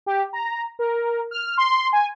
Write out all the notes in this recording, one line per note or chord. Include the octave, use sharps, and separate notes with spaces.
G4
A#5
A#4
F6
C6
G#5